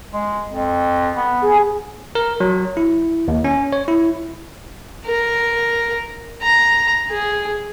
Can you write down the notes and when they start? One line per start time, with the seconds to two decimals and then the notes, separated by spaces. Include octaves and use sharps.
0.14 G#3
0.50 F2
1.15 B3
1.42 G#4
2.15 A#4
2.40 F#3
2.77 E4
3.28 D#2
3.44 C#4
3.73 C#5
3.88 E4
5.06 A#4
6.42 A#5
7.10 G#4